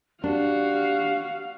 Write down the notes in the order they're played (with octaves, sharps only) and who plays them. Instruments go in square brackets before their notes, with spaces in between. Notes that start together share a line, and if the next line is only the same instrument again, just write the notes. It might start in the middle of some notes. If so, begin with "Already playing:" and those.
[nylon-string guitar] D4 [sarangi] F#4 [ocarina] G4 [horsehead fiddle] F5